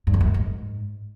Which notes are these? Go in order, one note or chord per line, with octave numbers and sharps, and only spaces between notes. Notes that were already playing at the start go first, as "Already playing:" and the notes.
G2
E2
F#2
B2
G#2